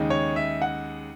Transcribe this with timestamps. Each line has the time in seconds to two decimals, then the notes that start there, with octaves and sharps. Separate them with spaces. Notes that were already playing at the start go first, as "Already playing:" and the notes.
Already playing: D#2 C#3 G#3 D#4
0.10 C#5
0.36 E5
0.62 F#5